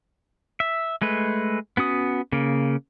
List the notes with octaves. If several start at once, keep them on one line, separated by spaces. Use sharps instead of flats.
E5
G#3 A3 B4
B3 C#4 F#4 D#6
C#3 A#3